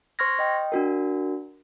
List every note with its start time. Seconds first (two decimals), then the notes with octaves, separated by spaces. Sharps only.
0.19 C5 C6 C#6 F6 G#6 A#6
0.39 D#5 G5
0.72 D4 F#4 A#4